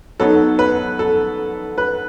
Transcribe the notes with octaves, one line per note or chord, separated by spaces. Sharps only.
F#3 B3 D#4 A4
B4
A4
B4